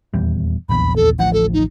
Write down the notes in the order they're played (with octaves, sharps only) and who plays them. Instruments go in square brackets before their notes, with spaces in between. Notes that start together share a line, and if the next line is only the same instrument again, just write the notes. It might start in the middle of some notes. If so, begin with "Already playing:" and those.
[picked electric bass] D#1 E2 G3
[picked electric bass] D#1 A#1 E2 [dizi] B5
[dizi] A4
[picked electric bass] A1 D2 F3 [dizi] F#5
[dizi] A4
D#4